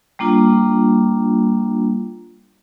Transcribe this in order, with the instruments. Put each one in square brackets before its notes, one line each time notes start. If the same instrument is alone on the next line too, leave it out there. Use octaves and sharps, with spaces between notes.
[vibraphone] G3 A#3 D4 F4